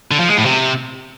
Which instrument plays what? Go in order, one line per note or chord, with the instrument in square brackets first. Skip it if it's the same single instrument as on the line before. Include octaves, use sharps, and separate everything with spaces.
[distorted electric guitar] D3
F3
G#3
A2
C3